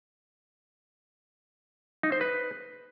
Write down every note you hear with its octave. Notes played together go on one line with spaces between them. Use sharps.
D#4
C5
B4